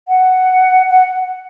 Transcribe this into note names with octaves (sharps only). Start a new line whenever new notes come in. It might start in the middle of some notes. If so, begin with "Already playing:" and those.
F#5
F#5